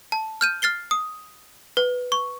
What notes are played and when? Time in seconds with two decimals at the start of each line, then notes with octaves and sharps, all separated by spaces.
0.12 A5
0.41 F6 G6 D#7
0.62 F6 A6 C7 G7
0.91 D#6
1.77 B4
2.12 C#6